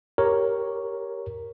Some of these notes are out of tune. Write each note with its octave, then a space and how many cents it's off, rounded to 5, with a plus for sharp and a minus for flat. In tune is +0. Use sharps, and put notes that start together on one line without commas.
G4 +0 A#4 +0 C#5 +0